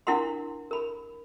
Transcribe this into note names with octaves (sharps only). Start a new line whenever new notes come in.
D4 E4 A#4 F#5 C6
A#4 B5